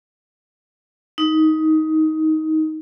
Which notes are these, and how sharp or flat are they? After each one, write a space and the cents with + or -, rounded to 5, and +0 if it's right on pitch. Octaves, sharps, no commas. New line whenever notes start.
D#4 +15